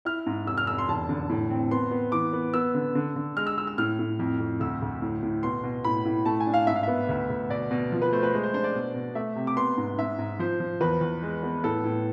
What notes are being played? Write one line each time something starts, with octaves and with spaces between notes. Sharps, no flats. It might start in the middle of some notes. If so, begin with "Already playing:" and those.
E4 F6
G#2
F1 E6
F6
F1 E6
C6
E1 A5
D3
A2
C4
B3 C6
B3
E3 D6
B3
B3 E6
D3
D3
D3
G#3 F6
E6
G#3 E6
E6
A2 F6
A2
F2
F2
D2 E6
D2
A2
A2
B2 C6
B2
A2 B5
A2
A3 A5
G#5
D4
F5
G#2 E5
F5
B3 E5
D2
D2
B2 D5
B2
F3
B4
A3 C5
B4
G#3 C5
C5
D4 C5
D5
B2
B2
A3 E5
C3
D6
B3 C6
G#2
G#2 E5
G#2
F3 C5
F3
E2 B4
E2
G#3
B3
A2 A4
A2